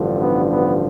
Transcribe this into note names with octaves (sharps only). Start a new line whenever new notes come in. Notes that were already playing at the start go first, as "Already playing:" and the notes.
Already playing: A1 G2 D3 F3
B3
B3